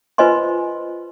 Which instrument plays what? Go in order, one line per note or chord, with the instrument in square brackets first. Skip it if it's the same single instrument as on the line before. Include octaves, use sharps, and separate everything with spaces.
[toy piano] F4 B4 C5 D#5 G#5 C6